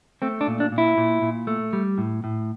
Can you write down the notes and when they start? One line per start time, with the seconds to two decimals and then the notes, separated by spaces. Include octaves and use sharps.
0.22 A3 C4
0.41 D4
0.47 A#2
0.60 D4
0.72 A#2
0.78 E4
0.98 A#2
1.22 A#2
1.47 A3
1.73 G3
1.98 A2
2.24 A2